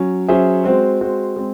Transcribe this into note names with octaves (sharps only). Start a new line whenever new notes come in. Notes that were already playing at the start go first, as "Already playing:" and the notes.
Already playing: F#3 C#4
F#3 C#4 G#4 C5 E5
G#3 C4 F#4 C5
G#3 C4 F#4 C5
G#3 C4